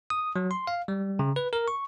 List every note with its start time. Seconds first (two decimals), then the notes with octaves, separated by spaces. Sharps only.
0.10 D#6
0.36 F#3
0.51 C6
0.67 F5
0.88 G3
1.19 C#3
1.36 B4
1.53 A#4
1.68 C#6